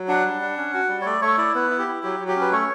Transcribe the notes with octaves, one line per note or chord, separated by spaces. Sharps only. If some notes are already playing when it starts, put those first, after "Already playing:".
Already playing: F#3
D4 F#5
G3
D4
C#4
F#4
G3
C#5
A3 D5
A3 C#5
E4 D5
B3 B4
E4
G4
E4
F#3 G4
F#3
G4
C#4
B4
A3 C#5